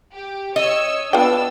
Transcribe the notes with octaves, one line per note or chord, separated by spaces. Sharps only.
G4
C#5 D#5 C#6 E6
B3 D4 F4 G5 E6